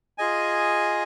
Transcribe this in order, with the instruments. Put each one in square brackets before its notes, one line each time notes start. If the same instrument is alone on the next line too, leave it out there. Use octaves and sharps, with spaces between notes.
[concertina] F4 G#4 D#5 G#5